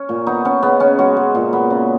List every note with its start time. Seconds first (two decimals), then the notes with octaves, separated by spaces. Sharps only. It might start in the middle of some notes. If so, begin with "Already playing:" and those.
Already playing: C#4
0.09 A#2
0.26 B3 D#4
0.45 B3 C#4
0.63 C#3 B3
0.80 C#3 C#4
0.99 G#3 F#4
1.17 G#3
1.35 A#2
1.53 B3
1.70 C#3